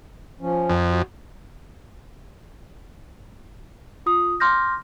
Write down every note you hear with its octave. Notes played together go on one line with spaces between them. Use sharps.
F3 C#4
F2
F#4
F4 D#6
C6 D6 F6 G6 A#6